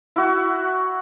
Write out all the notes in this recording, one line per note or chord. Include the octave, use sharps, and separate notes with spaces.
E4 F#4